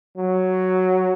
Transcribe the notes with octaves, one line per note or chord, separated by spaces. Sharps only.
F#3